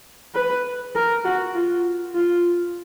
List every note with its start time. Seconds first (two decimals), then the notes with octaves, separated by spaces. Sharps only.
0.35 B4
0.95 A#4
1.25 F#4
1.55 F4
2.15 F4